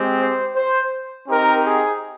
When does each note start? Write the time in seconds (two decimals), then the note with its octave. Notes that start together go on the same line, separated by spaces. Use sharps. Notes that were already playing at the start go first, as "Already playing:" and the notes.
Already playing: G#3 C4 G4
0.19 C5
0.55 C5
1.28 C4 D#4 G4 A#4
1.65 G#4